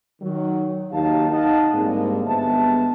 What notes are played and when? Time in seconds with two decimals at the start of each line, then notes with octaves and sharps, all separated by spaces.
0.21 D#3 F#3
0.92 D#2 F#3 D#4 G4 F5 A5
1.31 D#4 D#5 F5 F#5 A5
1.74 G#2 D3 G3 G#3 A#3 C4
2.26 G1 G#3 B3 E5 A5